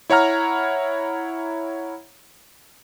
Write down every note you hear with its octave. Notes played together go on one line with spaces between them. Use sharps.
E4 C#5 F#5 A#5 F6